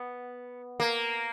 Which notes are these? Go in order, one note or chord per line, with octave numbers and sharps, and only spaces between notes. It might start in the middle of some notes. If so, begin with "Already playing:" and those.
Already playing: B3
A#3